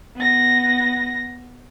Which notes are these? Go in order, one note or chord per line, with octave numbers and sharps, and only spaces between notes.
B3 A#6